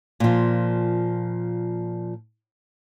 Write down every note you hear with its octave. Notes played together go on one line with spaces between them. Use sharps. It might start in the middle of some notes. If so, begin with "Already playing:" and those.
A#2 F3